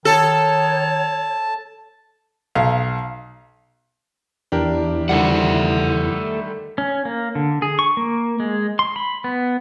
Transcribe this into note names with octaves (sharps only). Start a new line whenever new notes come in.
D#3 A4 C#5 A5
B1 F5
E2 D4 G4 A#4
D3 D#3 G3 A4 E5 F#5
C#4
A#3
D3
G#4
C#6
A#3
G#3
C6
B5
B3